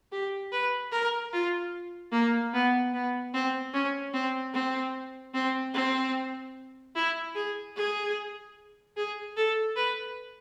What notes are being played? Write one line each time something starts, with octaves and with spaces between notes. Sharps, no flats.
G4
B4
A#4
F4
A#3
B3
B3
C4
C#4
C4
C4
C4
C4
E4
G#4
G#4
G#4
A4
B4